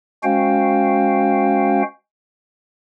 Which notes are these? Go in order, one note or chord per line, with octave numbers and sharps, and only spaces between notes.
G#3 C#4 F#4 C5 F5 G5